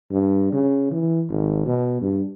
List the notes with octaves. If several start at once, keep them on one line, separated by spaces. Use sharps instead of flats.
G2
C#3
E3
G#1
B2
G2